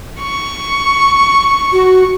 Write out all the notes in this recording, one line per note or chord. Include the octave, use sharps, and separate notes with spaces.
C#6
F#4